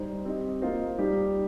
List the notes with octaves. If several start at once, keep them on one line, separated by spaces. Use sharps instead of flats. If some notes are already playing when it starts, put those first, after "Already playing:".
Already playing: G3 D#4 C5
C4 G4 D#5
A#3 F4 C5 D#5
G3 D#4 G4